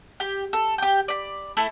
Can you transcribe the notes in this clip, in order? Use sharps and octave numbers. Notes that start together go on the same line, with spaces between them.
G4
A4
G4 G5
D5 B5
A3 E4 A4